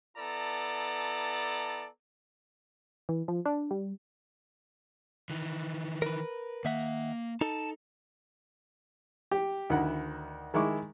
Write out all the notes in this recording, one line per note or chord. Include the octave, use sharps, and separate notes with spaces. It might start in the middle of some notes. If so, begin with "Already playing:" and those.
B3 E4 A4 D5 A5 A#5
E3
F3
D4
G3
D#3 E3
A#4 B4
D#3 A#3 E5 F#5
D#4 A4 A5
G4
D2 D#3 E4 F#5
D#3 G#3 E4 C#6 D6